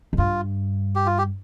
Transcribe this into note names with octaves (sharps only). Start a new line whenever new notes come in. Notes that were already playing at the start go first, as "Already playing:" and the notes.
F2
G2 F4
G4
F4
G4